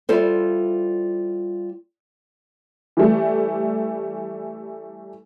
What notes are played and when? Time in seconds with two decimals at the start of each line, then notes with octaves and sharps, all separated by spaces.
0.09 G3 E4 F4 A4 C5
2.97 E3 G3 A3